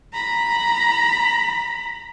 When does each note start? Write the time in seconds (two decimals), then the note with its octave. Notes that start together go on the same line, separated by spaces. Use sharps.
0.13 A#5 B5